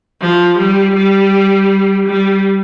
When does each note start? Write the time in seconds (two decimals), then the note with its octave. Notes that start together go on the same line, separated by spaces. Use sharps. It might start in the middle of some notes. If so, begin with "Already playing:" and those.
0.21 F3
0.58 G3
0.95 G3
2.07 G3